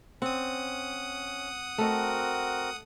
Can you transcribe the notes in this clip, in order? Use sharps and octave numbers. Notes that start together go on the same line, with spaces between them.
C4 C#4 F#5 D#6
A3 C4 F#4 A#4 D#5